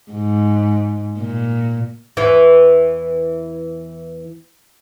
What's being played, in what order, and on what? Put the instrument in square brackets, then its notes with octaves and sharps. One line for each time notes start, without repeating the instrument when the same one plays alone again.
[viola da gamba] G#2
A#2
[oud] E2 E3